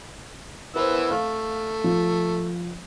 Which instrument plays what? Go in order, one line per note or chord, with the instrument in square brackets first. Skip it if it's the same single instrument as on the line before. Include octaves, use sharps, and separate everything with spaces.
[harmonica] E3 B3 E6 [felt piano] A#4 C5
[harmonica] A3 [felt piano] F5
[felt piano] F3